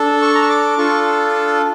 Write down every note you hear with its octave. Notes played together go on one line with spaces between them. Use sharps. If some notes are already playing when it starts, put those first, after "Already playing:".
Already playing: D4 A4
C#6
A#5
C#6
D6
D4 F4 A4 C#6